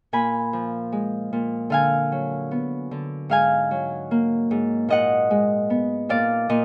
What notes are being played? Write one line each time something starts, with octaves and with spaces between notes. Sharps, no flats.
A#2 G#5 B5
F3
G#3
A#2
D3 F5 G#5
F#3
B3
D3
G#2 F5 G#5
F#3
A#3
G#2
A#2 D#5 F#5
G#3
B3
A#2 D5 F5
A#2 D#5